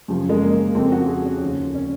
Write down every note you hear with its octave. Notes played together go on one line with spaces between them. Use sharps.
F#2 C#3 F3
G#3
A#3
A#3
F2 C#3 F3 C4
F#4
G#4
C#4
D#2 C#3 F3
C#4